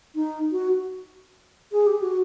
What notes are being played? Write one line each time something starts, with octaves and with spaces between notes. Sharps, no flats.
D#4
F#4
G#4
G4
F#4